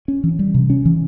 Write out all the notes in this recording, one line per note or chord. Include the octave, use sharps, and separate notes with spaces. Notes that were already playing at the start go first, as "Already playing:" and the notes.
C#4
E3
G3
C3
C#4
E3